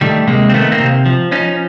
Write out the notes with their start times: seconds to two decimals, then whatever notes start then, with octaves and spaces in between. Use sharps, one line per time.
0.01 D#3 G3 A3
0.27 C3 G#3 A#3
0.49 C4
0.53 D#3 A3 B3
0.72 A#3 C4
0.80 C3
1.06 F3
1.31 F3 C#4 D#4